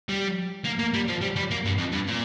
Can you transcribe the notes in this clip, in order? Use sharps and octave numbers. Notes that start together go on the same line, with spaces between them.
G3
A#3
A#3
G3
F3
G3
G3
A#3
G2
F2
G2
A#2